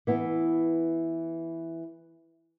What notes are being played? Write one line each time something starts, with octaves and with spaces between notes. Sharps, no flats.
E3 B3 E4